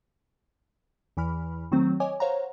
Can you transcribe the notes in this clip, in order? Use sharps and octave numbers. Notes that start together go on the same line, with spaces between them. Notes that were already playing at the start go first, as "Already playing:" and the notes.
E2 E3 B5 F6
D#3 F#3 A3 C4
C#5 D#5 G#5 D6
C5 C#5 F5 F#5 A#5